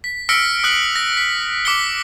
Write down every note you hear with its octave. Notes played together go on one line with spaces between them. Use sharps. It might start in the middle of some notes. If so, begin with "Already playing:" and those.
B6
E6 F6 A#6 B6 C#7 D7
D#6 F#6 F#7
A#6
B6
D6 B6 C#7 G7